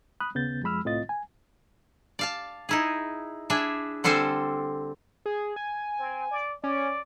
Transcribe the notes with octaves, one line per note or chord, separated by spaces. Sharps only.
B5 D#6 F#6
D#2 C#3 B3 G6 A6
F2 F3 G#3 B5 E6 F6
C2 A2 C4 F4 D#5 A6
G#5
D5 F5 A5
D#4 E4 G#4
D4 E4 G#4 E5
D3 G3 C4 A4 C5 G#5
G#4
G#5
C4
D5
C#4 D5